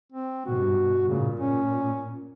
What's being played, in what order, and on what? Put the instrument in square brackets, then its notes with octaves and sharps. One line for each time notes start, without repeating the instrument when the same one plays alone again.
[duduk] C4
[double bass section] G2 B2 [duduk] F#4
[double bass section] A#2 [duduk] C#3
[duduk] C#4